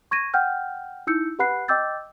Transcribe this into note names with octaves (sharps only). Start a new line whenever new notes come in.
C#6 G#6 A#6 D#7
F#5 G5 F6 G6
D#4 E4 E6 G6 C#7
G4 B4 F#5 B5 F#6 C7
D#5 G5 D6 E6 G6 A6